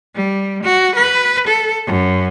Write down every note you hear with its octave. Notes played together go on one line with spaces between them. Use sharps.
G3
F#4
B4
A4
F#2